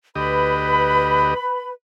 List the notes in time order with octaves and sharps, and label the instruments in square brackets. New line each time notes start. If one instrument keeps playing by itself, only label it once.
[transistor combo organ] D2 G4 D#5 [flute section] B4 B5